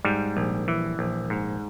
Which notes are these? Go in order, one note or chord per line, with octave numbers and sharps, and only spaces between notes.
G#2 G3
A#1
E3
A#1
G#2